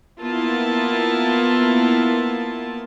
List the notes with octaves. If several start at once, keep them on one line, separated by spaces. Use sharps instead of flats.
A#3 B3 E4 F4 A5